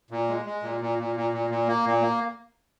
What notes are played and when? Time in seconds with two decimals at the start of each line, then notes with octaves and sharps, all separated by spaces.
0.11 A#2
0.29 G#3
0.46 G#3
0.63 A#2
0.81 A#2
0.99 A#2
1.16 A#2
1.33 A#2
1.50 A#2
1.68 A#3
1.86 A#2
2.02 A#3